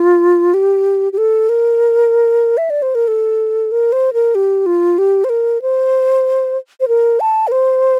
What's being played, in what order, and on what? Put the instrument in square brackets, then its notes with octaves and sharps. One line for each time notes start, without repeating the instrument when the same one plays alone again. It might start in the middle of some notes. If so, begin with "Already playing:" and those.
Already playing: [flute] F4
G4
G4
A4
A#4
E5
D5
C5
A#4
A4
A#4
C5
A#4
G4
F4
G4
C5
A#4
C5
C5
A#4
A5
A#4
C5